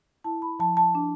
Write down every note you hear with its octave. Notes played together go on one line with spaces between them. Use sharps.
E4 A5
B5
F3 A5
A5
D4